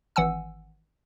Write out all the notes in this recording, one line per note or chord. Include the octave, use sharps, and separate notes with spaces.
G#1 E3 F#5 G#5 E6